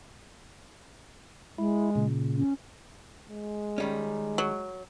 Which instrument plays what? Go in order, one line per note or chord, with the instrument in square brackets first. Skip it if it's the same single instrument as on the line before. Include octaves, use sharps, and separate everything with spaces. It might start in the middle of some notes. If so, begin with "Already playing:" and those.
[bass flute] G#3 [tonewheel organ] E4
[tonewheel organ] A#2 C#3
[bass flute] C#4
[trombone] G#3
[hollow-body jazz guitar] D#3 G3 C#4
[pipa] F#3